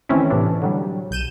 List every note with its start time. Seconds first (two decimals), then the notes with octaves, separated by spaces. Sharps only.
0.09 D#3 E3 A3 C4 C#4 E4
0.30 A2 C3 E3 D4
0.62 D3 F#3 G3
1.11 B1 G6 D#7 E7